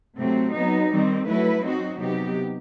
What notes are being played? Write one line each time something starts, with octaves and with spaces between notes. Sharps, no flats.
C3 F#3 A3 C4
F#3 B3 D#4
D#3 G3 C4
F#3 A3 E4 B4
F#3 C4 D#4 F#4
C3 F#3 B3 D#4 G4